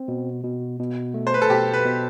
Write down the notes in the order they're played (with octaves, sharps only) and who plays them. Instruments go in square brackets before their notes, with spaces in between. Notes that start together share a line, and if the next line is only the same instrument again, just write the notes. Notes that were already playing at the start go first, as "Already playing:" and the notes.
Already playing: [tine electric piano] C4
B2
B2
B2
A3
[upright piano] C5
B4
A4
[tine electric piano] B2 [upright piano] G4
[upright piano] B4
[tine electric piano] B2